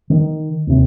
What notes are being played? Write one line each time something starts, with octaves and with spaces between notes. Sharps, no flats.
D#3
D#2 C3